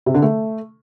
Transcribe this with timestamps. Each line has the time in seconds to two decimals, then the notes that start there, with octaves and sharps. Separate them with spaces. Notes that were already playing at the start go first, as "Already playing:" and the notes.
0.06 C3
0.14 D3
0.22 A3